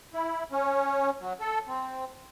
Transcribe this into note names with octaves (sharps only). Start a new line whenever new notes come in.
E4
C#4
F#3
A4
C4